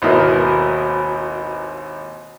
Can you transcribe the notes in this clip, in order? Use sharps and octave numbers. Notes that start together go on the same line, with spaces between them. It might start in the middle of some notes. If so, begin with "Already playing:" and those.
G#1 D#2 B2 E4 A#4 D#5